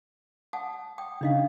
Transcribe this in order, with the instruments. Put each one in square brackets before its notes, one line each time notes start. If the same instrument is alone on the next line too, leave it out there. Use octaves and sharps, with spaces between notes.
[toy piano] F#5 A5 D#6
G5 D#6
[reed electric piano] C#3 D#4 [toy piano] D4 D#5 F5